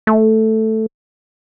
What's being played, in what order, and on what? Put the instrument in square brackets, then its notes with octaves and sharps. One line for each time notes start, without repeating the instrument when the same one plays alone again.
[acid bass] A3